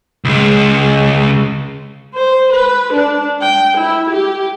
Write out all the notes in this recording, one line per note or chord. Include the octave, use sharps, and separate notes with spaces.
C#2 G#3
C5
B4
D4
G5
E4
G4